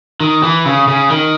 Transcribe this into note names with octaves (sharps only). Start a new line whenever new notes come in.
D#3
E3
C#3
C#3
D#3